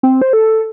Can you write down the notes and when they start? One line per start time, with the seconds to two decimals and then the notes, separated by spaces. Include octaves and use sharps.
0.03 C4
0.22 C5
0.33 A4